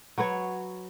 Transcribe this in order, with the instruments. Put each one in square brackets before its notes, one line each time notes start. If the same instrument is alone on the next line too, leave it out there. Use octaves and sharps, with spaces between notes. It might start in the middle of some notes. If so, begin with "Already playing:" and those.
[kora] F#3 F#4 B4 C#5